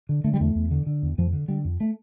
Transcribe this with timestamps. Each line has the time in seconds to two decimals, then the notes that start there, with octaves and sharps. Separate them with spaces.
0.09 D3
0.24 D3 A3
0.34 G3
0.40 E2 A3
0.55 E2
0.71 D3
0.86 D3
1.02 E2
1.18 F2 F3
1.33 D3
1.48 D3 G3
1.65 F2
1.80 A3